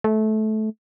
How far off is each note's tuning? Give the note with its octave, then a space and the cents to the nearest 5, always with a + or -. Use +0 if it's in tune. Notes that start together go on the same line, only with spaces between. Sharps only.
A3 -20